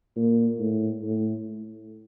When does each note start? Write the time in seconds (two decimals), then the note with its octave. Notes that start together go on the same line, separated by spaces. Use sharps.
0.16 A#2
0.59 A2
1.02 A2